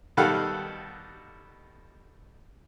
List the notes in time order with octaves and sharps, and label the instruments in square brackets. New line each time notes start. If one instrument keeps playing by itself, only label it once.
[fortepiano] B2 D#3 G3 A4 F5 F#5